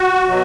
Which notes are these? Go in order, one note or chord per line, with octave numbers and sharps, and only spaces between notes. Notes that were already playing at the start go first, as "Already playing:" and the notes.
Already playing: F#4
B2 F#3